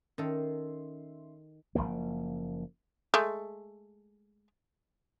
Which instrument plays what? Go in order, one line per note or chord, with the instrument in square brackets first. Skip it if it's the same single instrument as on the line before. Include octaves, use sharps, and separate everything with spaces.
[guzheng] D#3 A4 [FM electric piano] C#4 E5 C6
[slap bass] F#1 D#2 F3 A#3
[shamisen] G#3 A3